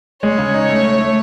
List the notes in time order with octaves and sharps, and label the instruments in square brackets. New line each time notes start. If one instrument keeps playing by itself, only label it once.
[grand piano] G#3 [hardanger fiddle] C#5
[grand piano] C#3
D#4
A3
A3
A3